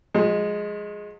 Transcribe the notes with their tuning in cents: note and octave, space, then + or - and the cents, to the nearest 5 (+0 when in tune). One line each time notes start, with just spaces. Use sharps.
F3 +45 G#3 +0